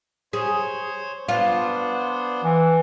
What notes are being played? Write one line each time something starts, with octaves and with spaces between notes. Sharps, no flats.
G#4 C5 C#5
B3 D4 F4 C5
E3